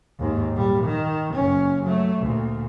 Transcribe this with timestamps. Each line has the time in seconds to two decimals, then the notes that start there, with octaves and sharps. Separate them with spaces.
0.19 D#2 G#2
0.54 A#2 G3
0.84 D#3
1.34 F#1 C#4
1.83 F#3 A3
2.21 D2 A#2